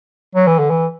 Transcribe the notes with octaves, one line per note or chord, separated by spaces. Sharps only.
F#3
E3
D3
E3